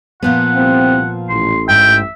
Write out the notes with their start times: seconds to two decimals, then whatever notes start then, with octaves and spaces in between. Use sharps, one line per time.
0.23 A#2 F3 B3 F#5
0.56 C2 C4
1.29 A1 C6
1.69 G#2 E5 G5